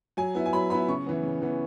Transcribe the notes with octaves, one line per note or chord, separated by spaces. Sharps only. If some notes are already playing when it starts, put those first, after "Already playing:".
F#3 G#5
B3 E4
G#5
F#3 B5
B3 E4 B5
C#3 C#6
E3 B3
C#3
E3 B3